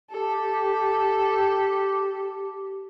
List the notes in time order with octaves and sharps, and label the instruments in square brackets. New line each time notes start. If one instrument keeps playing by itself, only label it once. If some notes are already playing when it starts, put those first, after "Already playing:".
[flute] G4 [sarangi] A4